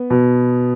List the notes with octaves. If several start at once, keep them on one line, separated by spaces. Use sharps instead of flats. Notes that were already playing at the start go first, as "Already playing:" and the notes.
Already playing: B3
B2